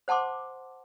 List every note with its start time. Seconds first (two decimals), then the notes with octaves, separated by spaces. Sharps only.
0.08 C5 F#5 A5 C6 D6